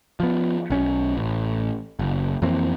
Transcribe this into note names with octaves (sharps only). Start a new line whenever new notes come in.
F3 B3
B1 C#4
A1
F#1
F2 E3 A#3 C4